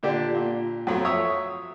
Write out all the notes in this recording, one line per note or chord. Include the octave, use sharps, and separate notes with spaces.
A#2 D3 D4 G4
A#2
F2 F#3 A3
C#5 E5 D#6